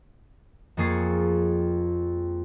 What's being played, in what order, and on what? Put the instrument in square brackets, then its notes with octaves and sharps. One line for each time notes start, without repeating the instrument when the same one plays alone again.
[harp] F2 A#3 G#4 C#6 A6 C7